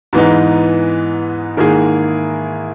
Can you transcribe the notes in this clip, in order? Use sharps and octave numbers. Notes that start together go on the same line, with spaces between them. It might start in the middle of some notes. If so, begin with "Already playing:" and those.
G#2 E3 B3 D#4
G#2 D#3 A#3 E4 G#4